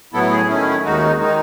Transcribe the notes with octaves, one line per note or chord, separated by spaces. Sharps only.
A2 F#3 B3 E4 A4
G#4
D#3 A3 C#4 E4
D#2 D#3 G#3 D#4 F#4
D#3 G#3 D#4